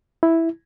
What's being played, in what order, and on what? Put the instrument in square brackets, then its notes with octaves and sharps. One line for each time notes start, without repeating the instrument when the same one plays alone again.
[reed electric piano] E4